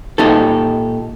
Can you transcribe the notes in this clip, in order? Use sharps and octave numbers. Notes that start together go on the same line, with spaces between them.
A#2 D#4 G4 A4